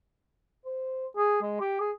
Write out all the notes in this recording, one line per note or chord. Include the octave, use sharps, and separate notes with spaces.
C5
G#4
G#3
G4
G#4